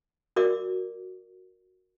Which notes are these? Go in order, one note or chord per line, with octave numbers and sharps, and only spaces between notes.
F#4 A#4 D5 E5 D6